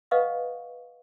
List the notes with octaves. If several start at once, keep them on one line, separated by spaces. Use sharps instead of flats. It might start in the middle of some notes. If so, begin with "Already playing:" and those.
B4 D#5 F5 F#5 C#6 D#6